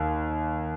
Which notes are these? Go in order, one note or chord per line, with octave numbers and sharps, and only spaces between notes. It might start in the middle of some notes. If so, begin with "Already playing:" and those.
Already playing: D#2